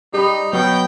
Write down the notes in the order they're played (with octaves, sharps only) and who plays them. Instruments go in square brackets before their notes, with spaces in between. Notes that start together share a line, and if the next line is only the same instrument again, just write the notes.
[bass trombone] G3 [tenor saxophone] D#4 [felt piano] G4 B5
[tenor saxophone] B2 [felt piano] F#3 [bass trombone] B3 [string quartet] G5